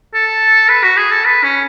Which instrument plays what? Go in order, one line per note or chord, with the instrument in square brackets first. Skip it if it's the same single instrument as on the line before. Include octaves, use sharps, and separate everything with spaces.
[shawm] A4
B4
F#4
G#4
A4
B4
C#4